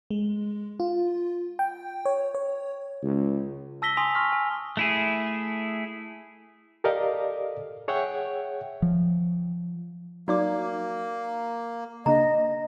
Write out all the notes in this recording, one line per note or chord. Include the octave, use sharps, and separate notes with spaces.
G#3
F4
G5
C#5
C#5
C#2
A5 E6 A#6 B6 G7
G#5 C6 D#6 B6 F7
C6 C#6 F6 B6
G#5
A3 E4 G#4
G4 A4 A#4 D5 D#5 F5
G#4 C#5 E5 F#5 G5
F3
F#3 A#3 D#4 F#4 D5 D6
C#3 A#3 D4 D#5 A#5